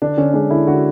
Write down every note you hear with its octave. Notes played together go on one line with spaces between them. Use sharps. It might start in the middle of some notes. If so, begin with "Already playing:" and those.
D3 D4
D3 C#4
G#3 D4
D3 E4
D3 F#4